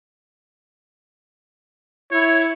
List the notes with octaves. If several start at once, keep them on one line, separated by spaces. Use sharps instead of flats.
E4 C#5